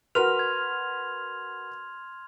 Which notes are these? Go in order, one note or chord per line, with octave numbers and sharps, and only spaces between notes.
F#4 A#4 B4 C6 F6 F7
G#6